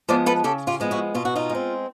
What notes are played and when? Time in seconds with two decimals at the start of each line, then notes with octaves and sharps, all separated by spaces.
0.08 F3 G#3 B3 C5 D5
0.26 A4 B4
0.44 C#3 G4 A4
0.67 F4 G4
0.80 F3 G#3 B3
0.91 E4 F#4
1.15 B2 F4
1.25 F#4
1.35 D#4 F4
1.50 G#3
1.55 C4